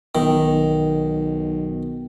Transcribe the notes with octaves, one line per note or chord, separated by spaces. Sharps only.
B1 D#3